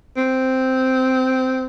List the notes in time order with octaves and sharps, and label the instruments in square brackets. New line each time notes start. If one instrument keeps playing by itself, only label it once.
[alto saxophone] C4